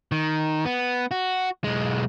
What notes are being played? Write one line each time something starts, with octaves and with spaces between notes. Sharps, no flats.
D#3
B3
F#4
B1 G#3